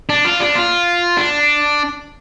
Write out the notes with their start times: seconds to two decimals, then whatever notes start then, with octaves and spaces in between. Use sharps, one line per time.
0.09 D4
0.25 F4
0.40 D4
0.55 F4
1.17 D4